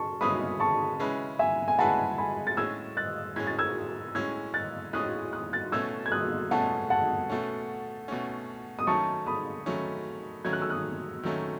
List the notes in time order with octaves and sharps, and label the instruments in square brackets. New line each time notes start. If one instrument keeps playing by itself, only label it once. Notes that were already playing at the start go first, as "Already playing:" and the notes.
Already playing: [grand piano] C#3 [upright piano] A5 C#6
[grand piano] C#3 G#3 C#4 E4 B4 [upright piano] B5 D#6
[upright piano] A5 C#6
[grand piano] C#3 G#3 C#4 E4 B4
[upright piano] E5 G#5
G#5
[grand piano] C#3 G#3 C#4 E4 B4 [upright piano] F#5 A5
[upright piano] G#5 B5
A6
[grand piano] A2 G#3 C#4 [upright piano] E6 G#6
[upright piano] F#6 A6
[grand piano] A2 G#3 C#4 [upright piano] G#6
[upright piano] A6
E6 G#6
[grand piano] A2 G#3 C#4 [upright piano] E6 G#6
[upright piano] F#6 A6
[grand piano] A2 G#3 C#4 [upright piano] D#6 F#6
[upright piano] D#6 F#6
F#6 A6
[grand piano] B2 A3 C#4 [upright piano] E6 G#6
[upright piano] G#6
D#6 F#6
[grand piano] B2 A3 C#4 [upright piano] F#5 A5
[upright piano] F#5 A5
[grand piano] B2 A3 C#4
B2 A3 C#4
[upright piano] D#6
[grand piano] D#3 F#3 A3 C#4 [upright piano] A5 C#6
[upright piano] B5 D#6
[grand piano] D#3 F#3 A3 C#4
[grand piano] D#3 F#3 A3 C#4 [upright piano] G#6
[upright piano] F#6
E6
D#6 F#6
[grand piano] D#3 F#3 A3 C#4